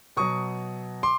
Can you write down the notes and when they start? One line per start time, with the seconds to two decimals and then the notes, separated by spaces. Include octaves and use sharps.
0.17 B2 F#3 C#6 D#6
1.03 C6 D6